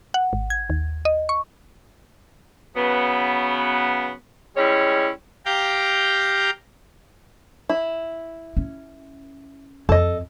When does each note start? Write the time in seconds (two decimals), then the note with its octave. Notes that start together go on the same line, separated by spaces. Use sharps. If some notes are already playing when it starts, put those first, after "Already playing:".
0.14 F#5
0.33 G#1
0.50 G#6
0.70 D#2
1.05 D#5
1.29 C#6
2.76 C#3 F#3 B3
4.57 G3 G#3 C#4 E4 C#5
5.46 G4 F5 G5 A#5 G6
7.69 E4
8.57 C#4
9.89 F2 A4 D#5